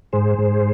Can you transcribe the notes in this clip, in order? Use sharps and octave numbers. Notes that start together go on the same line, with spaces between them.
G#2 G#4 C5
G#2